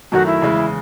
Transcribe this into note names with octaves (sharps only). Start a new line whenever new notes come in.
F#2 D#3 F#3 A3 F#4
E4
E2 C#3 G#3